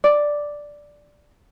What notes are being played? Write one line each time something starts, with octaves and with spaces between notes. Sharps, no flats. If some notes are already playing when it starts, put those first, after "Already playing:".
D5